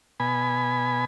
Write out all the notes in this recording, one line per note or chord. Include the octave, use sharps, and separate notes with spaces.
B2 G#5 B5